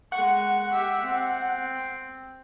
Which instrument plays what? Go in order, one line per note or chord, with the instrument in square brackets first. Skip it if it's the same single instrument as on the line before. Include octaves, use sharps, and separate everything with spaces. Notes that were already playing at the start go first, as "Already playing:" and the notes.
[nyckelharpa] G#3 C#6 [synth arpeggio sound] F#5
[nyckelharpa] G4 E5
C4